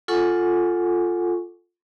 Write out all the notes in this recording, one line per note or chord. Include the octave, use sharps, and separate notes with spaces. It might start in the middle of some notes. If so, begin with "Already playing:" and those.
F4 A4 F#5 G#5 C#6 D6